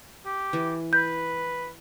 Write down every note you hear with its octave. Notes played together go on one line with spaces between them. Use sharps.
G4
E3
B4 G6